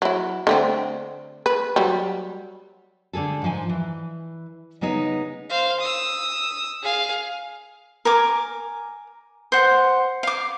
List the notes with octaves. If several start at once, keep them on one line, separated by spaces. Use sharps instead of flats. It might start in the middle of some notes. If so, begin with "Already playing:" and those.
F#3 E4
D3 A3 C4
B4
F#3 G3
D3 G#3 G#4 A4
G#2 F3 G#5
E3
C#3 G#3 B3 D#4 G#4
C5 F5
D#6 E6
G#4 F5
A#4 G#5 D6
C5 F#5
F5 D6